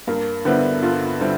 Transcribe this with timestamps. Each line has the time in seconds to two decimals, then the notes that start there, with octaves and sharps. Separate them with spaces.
0.07 G2 A#3
0.45 D3 G3 B3 C4 E4
0.82 G2 F4
1.21 D3 G3 C4 E4